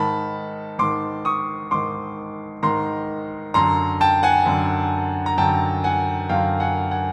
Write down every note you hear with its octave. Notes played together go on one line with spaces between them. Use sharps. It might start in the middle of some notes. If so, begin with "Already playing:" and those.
Already playing: G#2 D#3 A5 B5
G#2 D#3 C6 D6
C#6 D#6
G#2 D#3 C6 D6
G#2 D#3 A#5 C6
F#2 D3 A#5 C6
G5 A5
F#5 G#5
F#2 D3
A#5
F#2 D3 G5 A5
F#5 G#5
F#2 D3 F5 G5
F#5 G#5
F#5 G#5